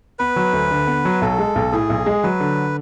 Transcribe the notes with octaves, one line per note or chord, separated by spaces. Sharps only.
B3 B4
F#3
D2
D3
B3
F#3
B1 A4
G#3
B1
A2 G#4
B1
G#3
F#3 B4
D3